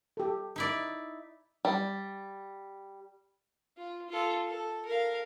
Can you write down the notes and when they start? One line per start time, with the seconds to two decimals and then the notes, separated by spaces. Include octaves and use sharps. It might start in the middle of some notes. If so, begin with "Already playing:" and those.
0.17 G4 A4
0.56 D#4 E4 D5
1.65 G3
3.77 F4
4.10 F4 A4
4.48 A4
4.86 A#4 F5